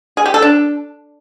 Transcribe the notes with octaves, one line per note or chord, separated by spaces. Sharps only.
G#4
G4
A4
D4